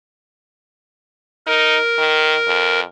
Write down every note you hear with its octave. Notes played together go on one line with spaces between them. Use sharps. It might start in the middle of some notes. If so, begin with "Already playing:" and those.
D#4 A#4
D#3
F2